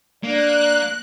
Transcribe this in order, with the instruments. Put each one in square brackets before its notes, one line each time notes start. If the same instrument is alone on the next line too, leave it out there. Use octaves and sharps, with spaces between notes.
[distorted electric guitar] A#3 [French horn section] D4 D5 [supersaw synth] F#6